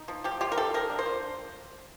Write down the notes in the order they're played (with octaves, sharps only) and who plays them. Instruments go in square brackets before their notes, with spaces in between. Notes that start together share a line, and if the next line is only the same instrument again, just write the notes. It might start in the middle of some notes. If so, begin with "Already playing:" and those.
Already playing: [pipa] D#4
F3
F3 G4
F4 G4
A#4
F3 A4
F3 A#4
D4
C5
F4